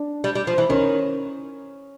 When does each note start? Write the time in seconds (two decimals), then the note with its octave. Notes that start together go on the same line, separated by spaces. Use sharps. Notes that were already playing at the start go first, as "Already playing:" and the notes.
Already playing: D4
0.24 G3
0.35 G3
0.47 F3
0.58 E3
0.69 D#3 C#4